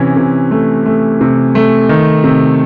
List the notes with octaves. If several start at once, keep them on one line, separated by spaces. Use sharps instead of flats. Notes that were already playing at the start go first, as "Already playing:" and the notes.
Already playing: C3 E3 C#4
C3
A3
A3
C3
A3
D#3
C3